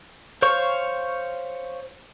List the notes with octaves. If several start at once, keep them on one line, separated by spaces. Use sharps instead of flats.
C5 C#5 F5 C#6